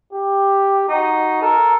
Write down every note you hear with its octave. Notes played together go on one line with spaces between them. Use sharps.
G4
D#4 F#4
A4 A#4